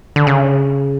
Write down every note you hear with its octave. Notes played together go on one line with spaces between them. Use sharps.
D3
C#3